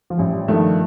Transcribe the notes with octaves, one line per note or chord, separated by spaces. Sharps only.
F3
A1 G3
G2 D#3 F3 A3